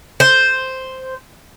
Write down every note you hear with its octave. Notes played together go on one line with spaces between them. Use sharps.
C5